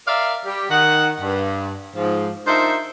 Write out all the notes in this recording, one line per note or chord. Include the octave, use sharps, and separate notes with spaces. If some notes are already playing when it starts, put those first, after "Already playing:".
A#4 D5 E5 F5
G3 G4
D#3 F#5
G2
G#2 F3
D4 D#4 F4 A#4 C5 E5